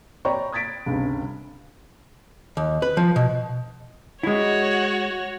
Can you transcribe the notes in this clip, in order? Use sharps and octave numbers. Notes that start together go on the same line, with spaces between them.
C#5 D5 G5 A#5 B5 C#6
D#6 G#6 A6 B6 D7
G1 C#2 C3
D#2
B4
F3
B2
G#3 E4 F#4 C#5